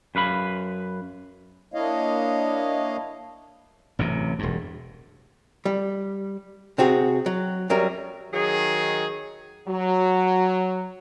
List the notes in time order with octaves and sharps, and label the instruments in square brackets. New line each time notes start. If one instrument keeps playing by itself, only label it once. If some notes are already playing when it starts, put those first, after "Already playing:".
[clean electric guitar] F#2 B4 F5 B5
[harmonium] A#3 D4 E4 C#5 D#5 F5
[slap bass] A1 F#2 C3
E1 G2
[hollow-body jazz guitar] G3
C3 C4 F#4 G#4
F#3
F#2 F#3 G3 A#4
[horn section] D#3 F#3 G#4
[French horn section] F#3